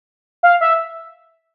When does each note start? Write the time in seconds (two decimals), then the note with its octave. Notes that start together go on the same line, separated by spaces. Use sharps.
0.43 F5
0.61 E5